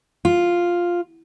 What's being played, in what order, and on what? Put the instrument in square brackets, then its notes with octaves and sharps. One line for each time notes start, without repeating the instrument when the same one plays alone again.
[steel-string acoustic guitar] F4